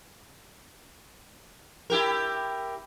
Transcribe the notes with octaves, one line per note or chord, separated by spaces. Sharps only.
E4 G4 A#4